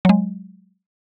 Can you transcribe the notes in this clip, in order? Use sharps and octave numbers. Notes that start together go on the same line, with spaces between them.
F#3 G#3